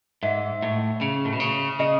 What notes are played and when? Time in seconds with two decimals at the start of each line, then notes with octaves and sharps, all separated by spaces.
0.23 G#2 E5
0.62 A2
1.01 C#3
1.25 A2
1.33 B2
1.40 C#3
1.79 C#3 D#5